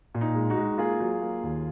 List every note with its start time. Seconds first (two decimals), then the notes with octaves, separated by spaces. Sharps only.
0.15 A#2
0.21 D#4
0.35 G#3
0.50 D#4 F#4
0.57 G#3
0.78 A#3 F4 G#4
1.00 F#3
1.22 A#3
1.43 D#2